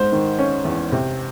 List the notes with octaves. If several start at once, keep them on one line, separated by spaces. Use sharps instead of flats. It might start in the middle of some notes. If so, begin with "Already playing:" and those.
Already playing: G#2 C5
D#3
C#4
E2
C3